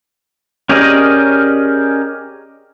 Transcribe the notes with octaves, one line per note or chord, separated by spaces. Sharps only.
C#4 G4 G#4 A#4 D5 D#5